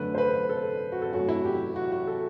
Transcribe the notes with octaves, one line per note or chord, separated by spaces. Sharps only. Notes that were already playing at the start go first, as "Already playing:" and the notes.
Already playing: F#2 D3 A3 B4
C5
B4
A4
F#4
A4
F#2 F#3 A3 F#4
E4
G4
F#4
F#4
A4